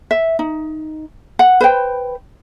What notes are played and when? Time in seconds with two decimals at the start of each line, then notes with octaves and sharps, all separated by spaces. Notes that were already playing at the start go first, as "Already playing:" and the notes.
0.11 E5
0.39 D#4
1.39 F#5
1.61 B4 C5 G5